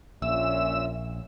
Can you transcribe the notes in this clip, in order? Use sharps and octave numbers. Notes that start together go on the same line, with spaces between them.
A#1 A#2 C#4 E5 E6